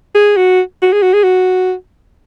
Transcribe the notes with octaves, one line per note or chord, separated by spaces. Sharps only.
G#4
F#4
F#4
G#4
F#4
G#4
F#4